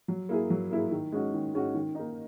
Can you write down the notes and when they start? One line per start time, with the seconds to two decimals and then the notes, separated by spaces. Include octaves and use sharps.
0.08 F#3
0.29 A#3 E4 G#4
0.50 F#3
0.71 A#3 E4 G#4
0.91 D#3
1.12 G#3 C#4 F#4
1.34 D#3
1.54 G#3 C#4 F#4
1.75 D#3
1.95 A#3 D#4